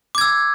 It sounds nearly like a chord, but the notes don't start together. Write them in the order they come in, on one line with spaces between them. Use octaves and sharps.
D6 G#6 E6